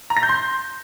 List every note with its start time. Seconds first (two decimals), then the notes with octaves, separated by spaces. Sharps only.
0.10 A#5
0.17 A#6
0.23 G6
0.29 C6